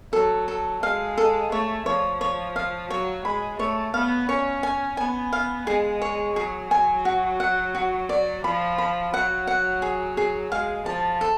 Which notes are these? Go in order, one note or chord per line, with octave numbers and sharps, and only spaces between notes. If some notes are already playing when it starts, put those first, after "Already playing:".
F#3 A4
A4
G#3 F5
A4
A3 C#5
F3 C#5
C#5
F5
F#3 C#5
G#3 B5
A3 C#5
B3 F5
C#4 C#5
G#5
B3 G#5
F5
G#3 G#4
C#5
F#3 G#4
G#5
F#4
F#5
F#4
D5
F3 B5
B5
F#3 F#5
F#5
G#4
G#4
G#3 F5
F3 A5
A4